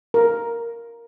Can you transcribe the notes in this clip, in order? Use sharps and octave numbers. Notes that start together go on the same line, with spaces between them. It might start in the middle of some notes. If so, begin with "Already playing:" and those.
A#4